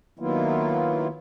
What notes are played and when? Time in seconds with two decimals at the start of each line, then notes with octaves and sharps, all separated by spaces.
0.19 D#3 F#3 A#3 B3 E4 F4